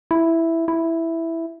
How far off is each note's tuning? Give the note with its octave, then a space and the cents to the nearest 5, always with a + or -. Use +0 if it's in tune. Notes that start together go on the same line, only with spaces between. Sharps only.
E4 +0
E4 +0